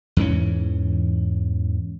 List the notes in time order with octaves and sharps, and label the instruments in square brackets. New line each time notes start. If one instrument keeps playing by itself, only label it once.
[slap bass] E2 G#2 E3 C#4